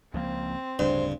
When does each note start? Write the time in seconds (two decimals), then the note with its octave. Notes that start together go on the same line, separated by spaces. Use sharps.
0.14 C#2 F3 A#3 C4
0.79 D1 D2 G2 C#3 C5